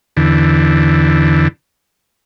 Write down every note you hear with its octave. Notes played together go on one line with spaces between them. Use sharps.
E2 D3